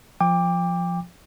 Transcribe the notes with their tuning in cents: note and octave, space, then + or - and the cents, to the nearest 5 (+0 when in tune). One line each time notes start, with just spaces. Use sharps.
F3 +0 G5 +30 D6 +0